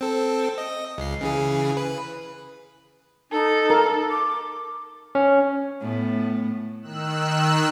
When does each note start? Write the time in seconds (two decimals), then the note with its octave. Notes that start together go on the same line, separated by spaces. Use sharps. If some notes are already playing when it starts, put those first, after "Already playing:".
0.01 C4 A4
0.58 D#5
0.98 C#2 C7
1.21 C#3 E3 G#4
1.77 B4
3.31 D#4 A4
3.70 A#4
4.10 D6
5.15 C#4
5.81 A2 B3
6.82 D#3 E6 F#6